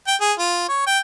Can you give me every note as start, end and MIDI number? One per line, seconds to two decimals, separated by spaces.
0.07 0.15 79
0.21 0.33 68
0.39 0.66 65
0.69 0.82 73
0.87 0.99 79